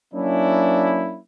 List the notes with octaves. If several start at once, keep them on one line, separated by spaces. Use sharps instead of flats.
F#3 A#3 C#4 D4 E4